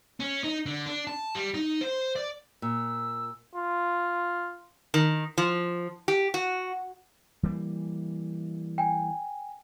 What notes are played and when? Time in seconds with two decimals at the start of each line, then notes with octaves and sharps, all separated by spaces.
0.20 C#4
0.44 D#4
0.66 D3
0.86 D4
1.07 A5
1.35 G3
1.54 D#4
1.81 C5
2.16 D5
2.62 A#2 E6
3.55 F4
4.94 D#3
5.38 F3
6.08 G4
6.34 F#4
7.43 E3 G3 A#3
8.78 G5 G#5